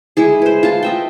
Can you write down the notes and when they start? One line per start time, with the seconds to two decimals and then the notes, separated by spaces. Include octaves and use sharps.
0.17 G#3 E4 G#4
0.42 B4 C5
0.63 F4 A5
0.83 D#5 E5 G5